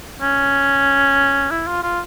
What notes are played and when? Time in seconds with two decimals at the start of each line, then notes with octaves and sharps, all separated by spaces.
0.21 C#4
1.51 E4
1.67 F4
1.83 F4